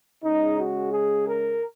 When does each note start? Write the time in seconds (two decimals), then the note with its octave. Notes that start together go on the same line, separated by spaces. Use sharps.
0.24 C#3 G#3 D#4
0.59 F#4
0.92 G#4
1.27 A#4